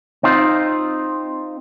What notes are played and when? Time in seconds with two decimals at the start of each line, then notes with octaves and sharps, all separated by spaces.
0.23 C4 D#4 F4